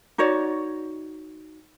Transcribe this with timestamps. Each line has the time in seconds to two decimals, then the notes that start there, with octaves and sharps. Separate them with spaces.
0.18 D#4 F#4 C#5 D5